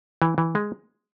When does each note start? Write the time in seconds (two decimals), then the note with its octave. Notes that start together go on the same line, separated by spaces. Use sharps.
0.22 E3
0.38 E3
0.55 G#3